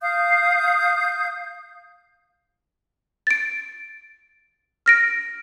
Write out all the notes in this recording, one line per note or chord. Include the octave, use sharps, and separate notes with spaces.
F5 D#6 G6
A6 D7
F6 A#6 D7